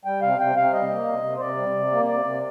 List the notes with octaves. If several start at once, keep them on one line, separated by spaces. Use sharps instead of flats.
G3 G5
C3 F5
C3 G5
C3 F5
G3 D#5
A#3
C3
C3
C5
C3 D5
G3
C3
A#3
C3 D5
C3